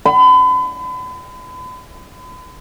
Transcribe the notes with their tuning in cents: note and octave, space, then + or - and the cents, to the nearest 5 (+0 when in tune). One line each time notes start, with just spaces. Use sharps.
B5 +40